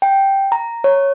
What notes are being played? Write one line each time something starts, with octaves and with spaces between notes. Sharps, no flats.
G5
A#5
C#5